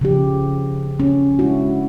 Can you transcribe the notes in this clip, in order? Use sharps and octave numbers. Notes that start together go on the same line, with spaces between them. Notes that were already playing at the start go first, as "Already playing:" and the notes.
C#3 F3 G4
C#4
G#3 D4 E4 F#4